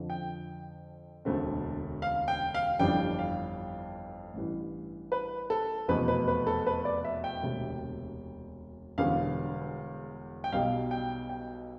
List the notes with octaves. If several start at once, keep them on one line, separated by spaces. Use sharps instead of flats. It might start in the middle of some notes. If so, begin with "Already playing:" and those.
Already playing: F2 D3 F3
G5
E1 D2 D3 A3 C4
F5
G5
F5
G1 F2 E3 G3 D4 G5
F5
A1 G2 E3
B4
A4
F1 E2 B2 B4
B4
B4
A4
B4
D5
E5
G5
E1 D2 C3
E1 E2 D3 G3 B3 F5
G5
B1 B2 G3 F5
G5
G5